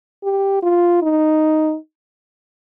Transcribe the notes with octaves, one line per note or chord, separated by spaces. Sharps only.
G4
F4
D#4